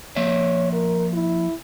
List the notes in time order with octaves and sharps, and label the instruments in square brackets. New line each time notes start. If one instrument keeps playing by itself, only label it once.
[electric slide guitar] F3 A#3 E5 [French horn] C#5
[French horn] A#4
E4